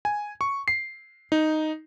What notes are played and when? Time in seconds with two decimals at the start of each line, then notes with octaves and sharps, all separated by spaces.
0.05 G#5
0.41 C#6
0.68 C7
1.32 D#4